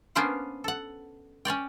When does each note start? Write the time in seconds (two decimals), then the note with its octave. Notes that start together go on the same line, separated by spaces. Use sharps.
0.15 A#3 B3 C#4 D4 C5 F#5
0.64 A4 F#5
1.45 C#4 C#5 D5 G5